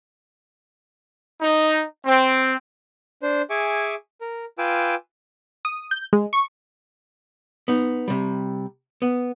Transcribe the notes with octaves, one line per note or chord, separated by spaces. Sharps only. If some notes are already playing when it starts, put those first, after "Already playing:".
D#4
C4
D4 C5
G#4 E5 G#5 C#6 D6
A#4
F4 B4 G5 G#5 D6 E6
D#6
G6
G#3
C#6
B3 D#4
C3 G3
B3